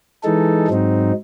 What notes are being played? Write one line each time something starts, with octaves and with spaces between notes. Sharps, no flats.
E3 G#3 D#4 A4
G#2 F#3 C4 D#4